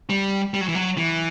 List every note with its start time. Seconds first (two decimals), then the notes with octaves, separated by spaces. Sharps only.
0.10 G3
0.54 G3
0.61 F#3
0.68 E3
0.75 F#3
0.98 E3